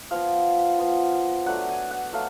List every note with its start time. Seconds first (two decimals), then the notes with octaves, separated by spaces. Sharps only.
0.11 F3 B3 F4 F5
0.78 F3 B3 F4
1.46 F#3 A3 D4 F#5
1.69 G#5
1.91 F#5
2.13 F#3 A3 F5